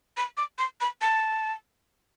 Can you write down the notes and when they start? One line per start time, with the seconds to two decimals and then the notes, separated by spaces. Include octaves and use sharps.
0.17 B5
0.37 D6
0.58 C6
0.81 B5
1.02 A5